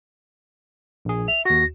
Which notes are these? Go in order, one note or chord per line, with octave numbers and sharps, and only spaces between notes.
A#1 G#4
E5 F7
D#2 F#4 A#6